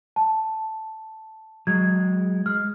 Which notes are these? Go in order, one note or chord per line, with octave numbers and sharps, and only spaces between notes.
A5
F#3 G#3 G#6
G#3 F6